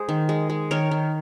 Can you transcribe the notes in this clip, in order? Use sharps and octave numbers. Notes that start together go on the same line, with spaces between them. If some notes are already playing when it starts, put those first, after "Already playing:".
Already playing: G#3 G#4 C5
D#3
G#3
G#3
D#3 A#4 C#5
D#3